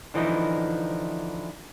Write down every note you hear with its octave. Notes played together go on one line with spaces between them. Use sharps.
D3 E3 F3 D#4 E4